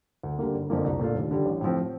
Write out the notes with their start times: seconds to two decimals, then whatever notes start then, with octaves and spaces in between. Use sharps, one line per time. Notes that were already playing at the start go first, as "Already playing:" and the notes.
0.23 D2
0.39 D3 G3 A#3
0.55 G1
0.70 F2 D3 F3 A#3
0.84 C2
1.00 A#2 A3 D4 F4
1.15 D#2
1.31 D3 G3
1.46 A1
1.61 A2 F3 C4